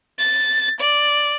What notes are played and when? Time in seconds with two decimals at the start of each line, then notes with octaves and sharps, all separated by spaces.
0.19 A6
0.80 D5